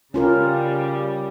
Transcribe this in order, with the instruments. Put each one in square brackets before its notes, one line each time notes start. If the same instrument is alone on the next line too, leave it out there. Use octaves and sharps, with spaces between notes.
[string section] C#3 G3 [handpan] C#4 F4 A#4